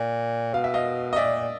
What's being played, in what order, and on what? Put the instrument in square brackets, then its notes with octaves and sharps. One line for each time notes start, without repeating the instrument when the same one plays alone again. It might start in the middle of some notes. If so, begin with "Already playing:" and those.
Already playing: [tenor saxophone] A#2
[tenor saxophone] B2 [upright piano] F5
[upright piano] E5
D#5 F5
D#5
[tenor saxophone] A#2 [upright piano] D5 E5